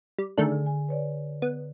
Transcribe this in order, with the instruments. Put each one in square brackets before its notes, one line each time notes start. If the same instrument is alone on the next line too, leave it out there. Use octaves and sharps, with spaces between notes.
[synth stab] G3
[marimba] D3 G#4 G#5 [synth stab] D#3 A3 D4
[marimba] D3
G#5
B4 C#5 D5
[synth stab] B3